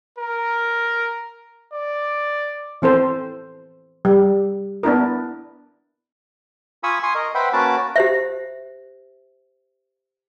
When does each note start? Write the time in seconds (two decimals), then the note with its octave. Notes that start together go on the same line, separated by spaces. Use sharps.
0.18 A#4
1.73 D5
2.82 E3 C4 A4 C5
4.05 G3
4.83 B3 D4 E4 A#4
6.83 F4 G#5 B5 C#6 D#6 E6
7.03 G#5 C6 C#6 D#6
7.15 A#4 D#5
7.35 B4 C5 E5 F#5 G5 B5
7.53 A#3 C#4 F#4 B4 A5 D6
7.96 G4 C5 E5